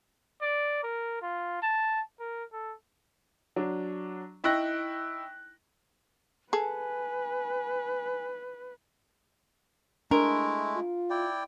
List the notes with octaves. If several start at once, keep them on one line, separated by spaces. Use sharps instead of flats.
D5
A#4
F4
A5
A#4
A4
F#3 D4
D#4 E4 G5 C#6 F#6 A#6
G#4 A4 B4 G#5
G#3 A3 D4 E4 A#4
F4
E4 D5 G5